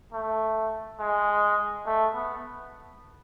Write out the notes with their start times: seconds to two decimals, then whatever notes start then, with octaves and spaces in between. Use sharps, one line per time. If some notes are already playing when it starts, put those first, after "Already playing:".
0.13 A3
1.00 G#3
1.86 A3
2.14 B3